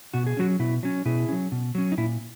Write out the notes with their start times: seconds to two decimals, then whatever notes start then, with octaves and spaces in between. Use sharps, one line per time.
0.14 B2 F#4
0.27 G#4
0.37 F#3 C#4 D#4 F#4
0.59 B2 E4
0.83 F#3 C#4
1.06 B2 E4 G#4
1.29 F#3 C#4
1.52 B2
1.75 F#3 C#4
1.92 D#4
1.98 A#2 E4